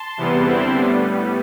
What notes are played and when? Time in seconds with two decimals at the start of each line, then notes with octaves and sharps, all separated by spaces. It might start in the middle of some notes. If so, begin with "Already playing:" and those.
Already playing: A5 C6
0.17 E2 C3 E3 G3 B3
0.45 E2 D3 G3 C4 E4
0.74 A2 G3 B3 D4